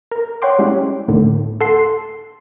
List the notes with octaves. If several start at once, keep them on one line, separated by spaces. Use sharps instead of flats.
A#4
C#5 F#5 G5 C6 D6
G3 G#3 C#4 E4
D2 A2 D3 D#3
A4 F#5 C6 C7